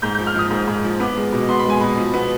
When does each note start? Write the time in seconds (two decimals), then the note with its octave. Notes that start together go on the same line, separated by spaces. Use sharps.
0.02 G#2 G6
0.15 G6
0.19 F3
0.27 F6
0.35 F3 D#6
0.51 G#2
0.67 G#2
0.84 F3
1.00 B3 D6
1.17 G#3
1.32 B2
1.49 B3 C6
1.59 B5
1.66 G#3 G#5
1.80 B2 B5
1.97 F3
2.14 B3